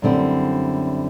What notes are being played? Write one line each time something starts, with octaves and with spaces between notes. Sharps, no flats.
F#2 D3 G3 C4 E4